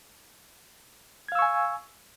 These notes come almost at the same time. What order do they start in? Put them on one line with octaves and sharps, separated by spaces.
G#6 F5 E6 C#6 G#5